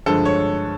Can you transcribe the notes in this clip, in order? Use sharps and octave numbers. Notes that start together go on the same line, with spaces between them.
G2 D3 F3 G#3 A4
C#5